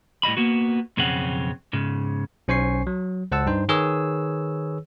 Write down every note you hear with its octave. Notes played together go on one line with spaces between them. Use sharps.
A2 G3 D#5 B5
A#3 B3 F#4
B1 F2 C#3 C4 C#4 F#5
G#2 C#3
B1 C#4 C5 G#5 C#6 C7
F#3
C#2 C5 F#5 A5 E6
G2 D#4 C5
D#3 G#4 B4 C#5 E6